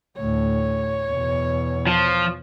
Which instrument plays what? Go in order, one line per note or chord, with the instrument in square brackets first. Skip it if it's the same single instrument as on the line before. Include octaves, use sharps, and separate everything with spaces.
[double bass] D2 A2 [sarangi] C#5
[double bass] E2 B2
[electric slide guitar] F3